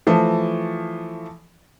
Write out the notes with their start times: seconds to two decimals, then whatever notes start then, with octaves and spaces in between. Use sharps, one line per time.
0.07 E3 F3 A3